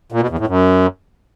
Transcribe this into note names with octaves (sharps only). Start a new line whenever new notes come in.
A#2
B2
E2
A2
F#2